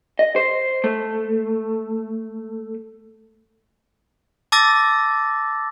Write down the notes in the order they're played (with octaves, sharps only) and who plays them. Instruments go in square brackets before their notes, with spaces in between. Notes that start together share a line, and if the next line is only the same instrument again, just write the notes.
[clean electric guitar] D#5
C5
A3
[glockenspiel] A5 D6 E6 A6 A#6